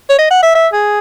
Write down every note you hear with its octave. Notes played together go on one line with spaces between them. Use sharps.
C#5
D#5
F#5
E5
E5
G#4